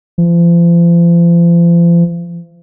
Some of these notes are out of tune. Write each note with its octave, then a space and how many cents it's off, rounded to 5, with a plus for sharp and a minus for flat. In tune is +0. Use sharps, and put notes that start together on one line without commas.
F3 -40